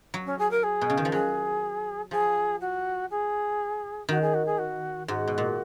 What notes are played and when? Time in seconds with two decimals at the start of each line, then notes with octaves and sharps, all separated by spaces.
0.14 F#3
0.26 C#4
0.39 G#4
0.51 A#4
0.63 G#4
0.81 B2
0.90 C#3
0.97 D#3
1.05 F3
1.12 F#3 G#4
2.11 F3 G#4
2.61 F#4
3.10 G#4
4.09 D#3 F#4
4.22 G#4
4.34 F#4
4.46 G#4
4.58 F#4
5.08 G#2 F#4
5.28 B2
5.38 A#2